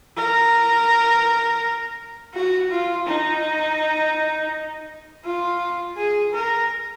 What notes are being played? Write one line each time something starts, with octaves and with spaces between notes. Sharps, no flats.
A#4
F#4
F4
D#4
F4
G#4
A#4